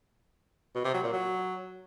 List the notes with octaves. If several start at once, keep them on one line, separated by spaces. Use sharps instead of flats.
B2
C3
F#3
A#2
F#3